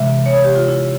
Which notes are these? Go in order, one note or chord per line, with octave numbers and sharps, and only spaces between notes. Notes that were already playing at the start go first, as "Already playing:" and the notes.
Already playing: C3 E3 G#3 E5
C#5
G4
F4
E4